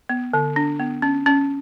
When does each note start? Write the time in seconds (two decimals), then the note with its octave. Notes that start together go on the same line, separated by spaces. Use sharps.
0.09 B3
0.33 D3
0.56 D4
0.79 B3
1.02 C#4
1.26 C#4